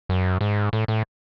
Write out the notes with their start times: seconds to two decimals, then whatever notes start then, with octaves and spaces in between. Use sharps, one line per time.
0.09 F#2
0.41 G#2
0.73 A2
0.88 A2